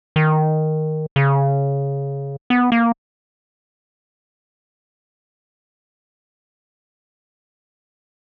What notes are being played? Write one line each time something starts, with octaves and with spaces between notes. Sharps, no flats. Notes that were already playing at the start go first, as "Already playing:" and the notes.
D#3
C#3
B3
A#3